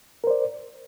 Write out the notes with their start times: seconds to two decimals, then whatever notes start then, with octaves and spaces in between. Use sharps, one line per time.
0.24 A#4
0.27 C5
0.30 D5